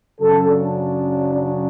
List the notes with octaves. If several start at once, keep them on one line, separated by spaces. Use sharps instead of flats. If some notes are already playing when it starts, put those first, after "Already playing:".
F#2 C#3 F#3 A4
D4
D4